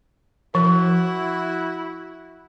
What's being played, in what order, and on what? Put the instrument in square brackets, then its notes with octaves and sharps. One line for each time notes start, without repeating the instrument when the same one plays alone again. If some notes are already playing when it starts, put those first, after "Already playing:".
[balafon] F3 A#4 [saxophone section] E4 F#4